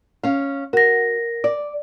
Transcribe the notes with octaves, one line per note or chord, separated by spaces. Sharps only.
C#4 F5
F#4 A#4 A#6
D5